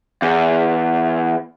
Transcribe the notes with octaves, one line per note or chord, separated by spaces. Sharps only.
E2